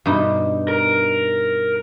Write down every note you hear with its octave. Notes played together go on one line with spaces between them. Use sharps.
G2 B2 D#4
A#4